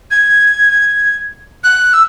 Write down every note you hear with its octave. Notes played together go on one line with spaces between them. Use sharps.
G#6
F#6
E6